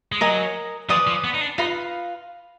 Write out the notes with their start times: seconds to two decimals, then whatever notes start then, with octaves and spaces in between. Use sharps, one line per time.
0.12 G#3
0.20 F#3 A#4 D#5 G#5
0.89 F3 B4 D5 G#5 D#6
1.07 F3
1.24 B3
1.34 D#4
1.41 D4
1.58 D#4 F4 B4 F5 B5